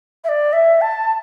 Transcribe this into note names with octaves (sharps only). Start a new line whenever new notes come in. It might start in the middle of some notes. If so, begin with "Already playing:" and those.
E5
D5
E5
A5